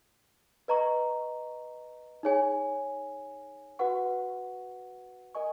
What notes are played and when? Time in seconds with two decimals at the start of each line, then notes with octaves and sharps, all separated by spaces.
0.68 B4 D#5 A#5 C#6
2.23 D#4 G#4 C#5 G#5
3.79 F#4 B4 F#5 C#6
5.35 A#4 D#5 G#5 C#6